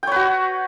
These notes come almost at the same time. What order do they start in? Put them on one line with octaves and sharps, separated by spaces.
G5 C#5 B4 F#4